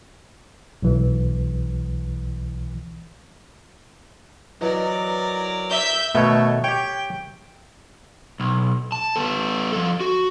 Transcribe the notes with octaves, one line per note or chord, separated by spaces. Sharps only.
B1 E3
E3 F#3 A#4 D5 D#5
E5 G6
B2 D#3 A3 C#5
G4 C#5 G5
B1
A5
B3 A4
F3 A4
F#4